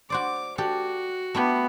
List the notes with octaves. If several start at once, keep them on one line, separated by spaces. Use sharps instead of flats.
F#4 C5 D5 D6
F#4 G4 A4 D5
A3 B3 E4 G4